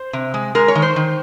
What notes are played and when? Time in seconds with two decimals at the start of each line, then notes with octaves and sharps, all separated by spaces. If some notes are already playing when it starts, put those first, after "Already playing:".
Already playing: C5
0.13 C3
0.34 G#3
0.55 G#3 A#4
0.68 C#5
0.75 D#3
0.82 C5
0.96 D#3